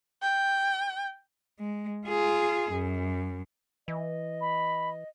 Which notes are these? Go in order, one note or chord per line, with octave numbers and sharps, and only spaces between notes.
G5
G#3
F4 G#4
F#2
E3 D#5
B5